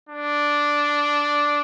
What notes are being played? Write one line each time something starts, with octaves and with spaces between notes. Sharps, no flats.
D4